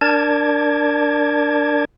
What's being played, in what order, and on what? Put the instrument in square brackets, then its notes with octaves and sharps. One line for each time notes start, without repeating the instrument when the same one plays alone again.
[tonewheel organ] D4 A#4 D5 A5 G#6